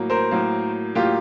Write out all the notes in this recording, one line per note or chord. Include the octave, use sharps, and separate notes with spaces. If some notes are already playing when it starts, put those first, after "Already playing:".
Already playing: A2 F#3 A#3
A#4 C5
A2 F#3 A#3
A2 F#3 A#3 F4 G4